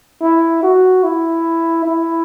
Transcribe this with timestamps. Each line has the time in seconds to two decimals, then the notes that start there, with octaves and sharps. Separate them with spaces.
0.22 E4
0.63 F#4
1.04 E4
1.85 E4